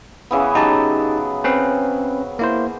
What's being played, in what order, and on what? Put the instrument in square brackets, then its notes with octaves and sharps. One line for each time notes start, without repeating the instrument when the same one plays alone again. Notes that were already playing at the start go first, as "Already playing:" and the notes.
[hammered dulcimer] C#3 E3 B3
[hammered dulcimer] F#3 [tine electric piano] D#4 G4 A5
[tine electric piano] C4 C#4 B4
A#3 E4 C5